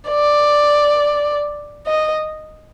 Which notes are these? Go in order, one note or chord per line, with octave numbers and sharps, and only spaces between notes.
D5
D#5